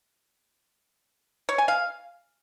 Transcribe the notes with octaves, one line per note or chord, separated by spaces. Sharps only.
C#5
G#5
F5